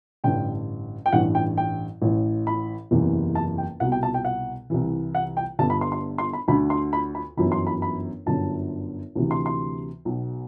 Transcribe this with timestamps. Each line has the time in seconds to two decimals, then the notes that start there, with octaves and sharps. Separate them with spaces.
0.24 A1 G2 D3 G5
1.06 G5
1.12 A1 G2 E3 F#5
1.35 G5
1.57 G5
2.02 A1 A2 E3
2.47 B5
2.91 F#1 E2 C3 E3
3.35 A5
3.58 G5
3.80 C2 B2 F#5
3.92 G5
4.03 A5
4.14 G5
4.25 F#5
4.70 C2 C3 E3
5.15 F#5
5.37 G5
5.59 G1 G2 D3 A5
5.70 B5
5.81 C6
5.92 C6
6.18 C6
6.33 B5
6.48 D2 D3 B5
6.70 C6
6.93 B5
7.15 B5
7.37 G1 F#2 E3 B5
7.52 C6
7.67 B5
7.82 B5
8.26 G1 F#2 D3 A5
9.15 D2 C3 E3
9.31 C6
9.46 C6
10.05 B1 B2